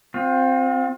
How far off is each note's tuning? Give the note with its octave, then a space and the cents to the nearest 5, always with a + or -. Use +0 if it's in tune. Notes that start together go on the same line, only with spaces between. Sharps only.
C4 +0 F4 +35